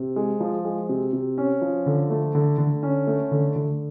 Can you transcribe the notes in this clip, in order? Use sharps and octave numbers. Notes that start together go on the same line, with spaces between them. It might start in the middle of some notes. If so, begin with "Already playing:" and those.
Already playing: C3
G#3
F3
G#3
C3
C3
C#4
F3
D3
A3
D3
D3
C#4
A3
D3
D3